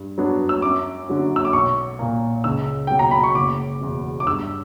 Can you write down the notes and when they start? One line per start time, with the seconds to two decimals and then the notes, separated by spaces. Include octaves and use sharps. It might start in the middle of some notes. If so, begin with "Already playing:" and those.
Already playing: G2
0.18 F#3 B3 D4
0.49 E6
0.62 F#2 D6
1.08 D3 F#3 C#4
1.36 E6
1.45 D6
1.53 B1 C#6
1.99 A#2 A#3
2.44 C#2 E6
2.87 B2 F#3 G5
2.99 A#5
3.11 B5
3.24 C#6
3.35 F#1 D6
3.81 E2 B2
4.20 D6
4.27 G2 E6